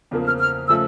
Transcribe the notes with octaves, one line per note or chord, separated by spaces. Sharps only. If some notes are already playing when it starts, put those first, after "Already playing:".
E2 C#3 F3 A#3
F6
F6
C#3 F3 A3 E6